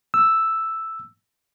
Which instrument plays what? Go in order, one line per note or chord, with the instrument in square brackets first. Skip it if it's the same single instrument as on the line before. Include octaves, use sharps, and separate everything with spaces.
[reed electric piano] E6